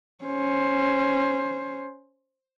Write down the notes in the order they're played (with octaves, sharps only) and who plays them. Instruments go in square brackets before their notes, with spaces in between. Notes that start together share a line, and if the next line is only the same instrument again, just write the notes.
[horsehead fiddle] C#4 C5